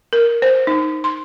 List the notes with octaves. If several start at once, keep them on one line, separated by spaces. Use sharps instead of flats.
A#4
C5
D#4
C6